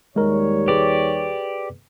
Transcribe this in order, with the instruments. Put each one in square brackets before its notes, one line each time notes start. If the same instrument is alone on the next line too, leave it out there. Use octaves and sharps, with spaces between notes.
[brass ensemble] D#2 G3 C#5 [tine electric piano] G#3 A#4
[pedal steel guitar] G4 D5 [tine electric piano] G#4 B4